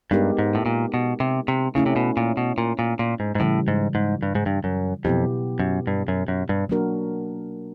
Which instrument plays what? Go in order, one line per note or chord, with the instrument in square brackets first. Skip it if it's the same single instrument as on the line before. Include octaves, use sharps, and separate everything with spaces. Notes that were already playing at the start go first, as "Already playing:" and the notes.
[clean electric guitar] G2 [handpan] G#3 B3 D#4 G4 A#4
[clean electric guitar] G#2
A2
A#2
B2
C3
C3
[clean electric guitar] C#3 [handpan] A3 C#4 E4
[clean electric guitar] C3
B2
A#2
B2
A#2
A#2
A#2
G#2
G#2
[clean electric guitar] A2 [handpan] C#3 E3 G3
[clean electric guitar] G#2
G#2
G2
G#2
G2
F#2
[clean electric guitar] F2 [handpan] B2 F#3 B3 E4 G4
[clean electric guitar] F#2
G2
F#2
F#2
G2
[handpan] F#3 A#3 D4 F#4 A#4